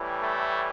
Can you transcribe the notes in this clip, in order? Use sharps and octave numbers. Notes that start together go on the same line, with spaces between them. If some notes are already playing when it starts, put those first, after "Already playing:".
Already playing: A2 E3 G3
A3